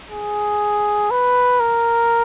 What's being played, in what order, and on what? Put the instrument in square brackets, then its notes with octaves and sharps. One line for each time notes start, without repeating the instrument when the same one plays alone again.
[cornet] G#4
B4
A#4